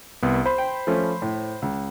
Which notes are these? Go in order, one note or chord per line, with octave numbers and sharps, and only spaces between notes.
C2 B3
C5 B5
G5
F3 A3 C#4
A2
C#2